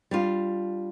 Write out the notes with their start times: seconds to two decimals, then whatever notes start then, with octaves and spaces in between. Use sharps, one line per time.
0.11 G3 D4 F4